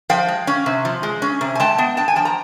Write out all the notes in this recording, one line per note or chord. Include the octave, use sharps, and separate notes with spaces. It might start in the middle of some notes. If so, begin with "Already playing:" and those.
F3 F5 G5
G#3
C#4
C3
F3
G#3
C#4
C3
G#5
G#3 G5 A5
B3
D4 G5 A5
G#5
F3 G5 A5
A#5